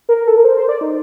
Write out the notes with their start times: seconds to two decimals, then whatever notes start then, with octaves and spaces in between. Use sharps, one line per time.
0.09 A#4
0.27 A4
0.36 A#4
0.45 C5
0.57 C5
0.69 D5
0.81 D#4